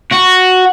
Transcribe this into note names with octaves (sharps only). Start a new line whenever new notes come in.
F#4